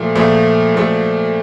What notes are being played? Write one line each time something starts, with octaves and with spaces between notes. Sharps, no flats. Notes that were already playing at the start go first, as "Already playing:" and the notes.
Already playing: A#2 F3 A3
A#2 F3 A3
A#2 F3 A3